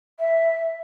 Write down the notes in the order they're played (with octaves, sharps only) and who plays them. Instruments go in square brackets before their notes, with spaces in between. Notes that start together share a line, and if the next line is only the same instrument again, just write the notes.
[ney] E5